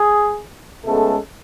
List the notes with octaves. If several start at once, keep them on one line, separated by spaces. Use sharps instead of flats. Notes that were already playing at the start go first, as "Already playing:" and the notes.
Already playing: G#4
C#2 C#3 G#3 A3 B3 A4